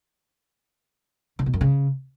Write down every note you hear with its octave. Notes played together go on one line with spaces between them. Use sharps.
C#3
B2
F#2
C#3